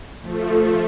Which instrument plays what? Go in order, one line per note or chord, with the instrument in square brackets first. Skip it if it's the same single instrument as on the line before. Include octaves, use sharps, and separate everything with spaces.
[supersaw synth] F3 A3